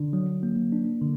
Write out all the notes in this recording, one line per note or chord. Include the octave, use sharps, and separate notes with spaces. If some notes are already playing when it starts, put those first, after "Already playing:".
Already playing: D3 D4
F#3
A#3
D4
D3